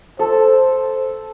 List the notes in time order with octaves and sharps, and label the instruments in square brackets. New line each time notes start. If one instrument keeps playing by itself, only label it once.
[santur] A4 [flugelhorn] C5